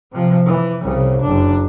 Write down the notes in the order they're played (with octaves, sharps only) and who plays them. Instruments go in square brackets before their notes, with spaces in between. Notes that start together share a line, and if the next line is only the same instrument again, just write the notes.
[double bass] C3 F3
E3
C2 C#3
F#1 D4